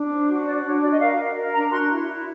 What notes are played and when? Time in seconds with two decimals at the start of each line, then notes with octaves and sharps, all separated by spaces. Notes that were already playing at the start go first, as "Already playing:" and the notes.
Already playing: D4
0.11 C5
0.29 F#4
0.47 D4 D5
0.65 D4 C#5
0.82 F#4 D5
0.92 D#5
1.00 A#4 F5
1.18 A#4
1.36 A#4
1.54 D4 A#5
1.71 F#4 C6
1.90 E4
2.08 E4